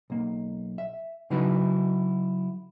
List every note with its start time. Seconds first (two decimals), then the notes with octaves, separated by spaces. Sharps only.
0.10 B1 A#3
0.78 E5
1.30 C#3 F#3 D#4 E4 F#4 B4